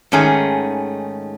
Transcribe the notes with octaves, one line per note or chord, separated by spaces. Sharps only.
G#2 D#3 A3 C#4 G#4